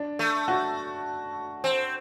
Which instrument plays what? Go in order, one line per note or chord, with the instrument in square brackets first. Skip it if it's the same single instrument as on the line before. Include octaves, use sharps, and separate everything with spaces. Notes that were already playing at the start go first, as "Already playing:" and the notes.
Already playing: [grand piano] D4
[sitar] A3
[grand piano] F#4
[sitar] C4